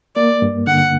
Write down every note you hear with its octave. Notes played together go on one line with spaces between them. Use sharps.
A#3 D5
G2
D3 F#5